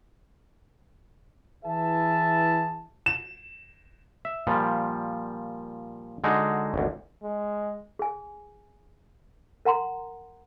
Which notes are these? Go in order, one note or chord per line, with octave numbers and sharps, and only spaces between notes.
E3 E4 G#4 B4 E5 A5
E7
E5
A#2 F3 G3
D3 G#3 D#4 F#4
G#1 D2
G#3
G#4 G#5
A#4 F#5 A#5 C6